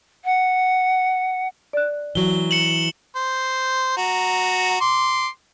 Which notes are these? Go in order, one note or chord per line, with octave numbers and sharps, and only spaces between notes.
F#5
D5 F#6
E3 F#3 G7
C#7 E7 F#7
C5
F#4 A#5
C6 D6